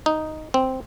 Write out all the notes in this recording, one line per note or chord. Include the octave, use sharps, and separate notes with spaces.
D#4
C4